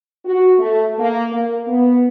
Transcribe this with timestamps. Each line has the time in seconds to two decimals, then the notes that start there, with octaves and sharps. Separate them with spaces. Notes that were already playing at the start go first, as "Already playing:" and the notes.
0.25 F#4
0.58 A3
0.98 A#3
1.31 A#3
1.67 B3